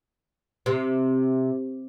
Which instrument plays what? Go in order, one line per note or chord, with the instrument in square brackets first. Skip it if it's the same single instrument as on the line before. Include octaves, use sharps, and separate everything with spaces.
[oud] C3